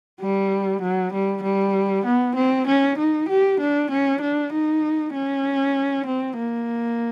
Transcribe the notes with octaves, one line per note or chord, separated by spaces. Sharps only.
G3
F#3
G3
G3
B3
C4
C#4
D#4
G4
D4
C#4
D4
D#4
C#4
C4
A#3